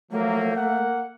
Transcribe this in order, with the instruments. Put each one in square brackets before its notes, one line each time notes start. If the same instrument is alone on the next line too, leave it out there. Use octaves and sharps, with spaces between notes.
[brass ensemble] F3 F#3 A#3 [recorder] A3
[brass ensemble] A#3 F#5